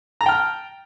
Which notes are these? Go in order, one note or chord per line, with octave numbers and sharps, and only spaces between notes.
G5 A5 A#5 F6